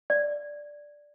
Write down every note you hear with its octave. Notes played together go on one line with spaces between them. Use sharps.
D5